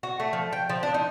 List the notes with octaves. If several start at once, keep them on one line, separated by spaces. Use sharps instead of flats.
F#4
A3
F3
G5
F3
D4
D#4